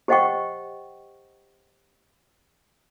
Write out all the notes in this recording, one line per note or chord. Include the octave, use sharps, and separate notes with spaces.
G4 C5 D#5 F#5 G5 C#6